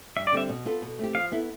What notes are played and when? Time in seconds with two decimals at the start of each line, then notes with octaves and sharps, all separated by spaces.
0.17 G2 E5
0.27 D5
0.32 D3 G3 C4 E5
0.49 B2
0.65 B3 F4 A4
0.82 B2
0.99 A3 C4 G4
1.15 F3 F5
1.32 B3 E4 A4